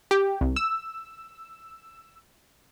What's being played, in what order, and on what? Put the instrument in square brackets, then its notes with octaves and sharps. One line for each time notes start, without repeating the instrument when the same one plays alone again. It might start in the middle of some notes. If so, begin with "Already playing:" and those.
[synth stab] G4
C2
E6